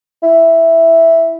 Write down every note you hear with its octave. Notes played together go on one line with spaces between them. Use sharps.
E4